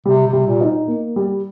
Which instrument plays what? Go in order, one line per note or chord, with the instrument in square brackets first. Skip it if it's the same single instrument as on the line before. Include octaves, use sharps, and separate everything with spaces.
[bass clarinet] C3 [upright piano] G3
[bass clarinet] C3
[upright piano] G3
[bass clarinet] A#2
[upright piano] D#4
A#3
G3